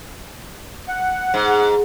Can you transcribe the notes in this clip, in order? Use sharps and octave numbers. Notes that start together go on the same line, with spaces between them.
F#5
G#2